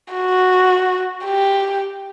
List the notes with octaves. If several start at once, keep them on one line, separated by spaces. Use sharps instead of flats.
F#4
G4